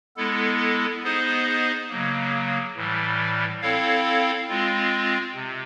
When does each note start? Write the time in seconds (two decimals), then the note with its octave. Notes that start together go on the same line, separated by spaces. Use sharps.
0.17 G#3 B3 E4 A4
1.02 B3 D#4 G#4 C5 D#5
1.89 C#3 F#3 A#3
2.76 A2 E3 G3
3.61 C4 E4 A4 C#5 F5
4.48 G#3 C4 F4
5.35 C3